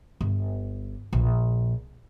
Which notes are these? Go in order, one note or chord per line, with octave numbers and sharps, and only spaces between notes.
G1
A#1